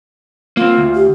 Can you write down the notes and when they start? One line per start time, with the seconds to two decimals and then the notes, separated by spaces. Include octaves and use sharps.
0.57 A#3 C4 F4
0.77 D2
0.95 G4